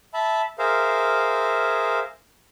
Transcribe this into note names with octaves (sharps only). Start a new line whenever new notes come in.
E5 A5 B5
G#4 A#4 C5 E5 F5